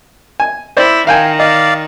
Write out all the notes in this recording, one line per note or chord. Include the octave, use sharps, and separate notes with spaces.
G#5
E4 C5 D5
D#3 F5 G5 G#5
D5 D#5 F5